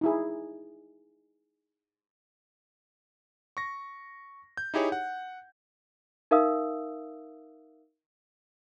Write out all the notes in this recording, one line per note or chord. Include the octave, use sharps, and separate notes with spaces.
D#4 E4 G#4
C#6 A#6
G6
D#4 E4 G4 G#4 C#5
F#5
D#4 A#4 E5 F5 D#6 E6